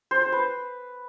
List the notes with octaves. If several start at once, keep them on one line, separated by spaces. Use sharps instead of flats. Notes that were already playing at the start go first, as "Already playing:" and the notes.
C5
C5
B4